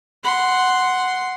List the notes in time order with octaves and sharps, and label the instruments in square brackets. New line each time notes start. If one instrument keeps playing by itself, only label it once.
[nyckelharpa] F#5 C6